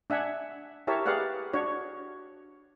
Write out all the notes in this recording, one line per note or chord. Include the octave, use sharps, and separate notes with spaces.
D4 E5 F#5 G#5
E4 G4 A#4 C#5 E5 A5
G4 G#4 B4 D5 F5 F#5
D4 F#4 C#5